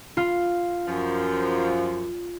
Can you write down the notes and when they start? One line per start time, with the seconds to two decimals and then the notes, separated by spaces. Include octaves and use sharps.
0.17 F4
0.88 F#2 F3